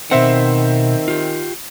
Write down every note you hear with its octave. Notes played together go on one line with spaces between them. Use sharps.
B2 D#3 C4 C5 E5 F#5
F4 G4